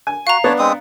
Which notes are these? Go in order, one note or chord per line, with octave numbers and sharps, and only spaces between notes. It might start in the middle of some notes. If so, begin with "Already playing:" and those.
G#5
F#4 F5 A#5
B3 D4 C#5 A5
G#3 C4 D#6